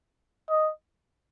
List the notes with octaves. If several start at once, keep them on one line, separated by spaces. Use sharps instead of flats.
D#5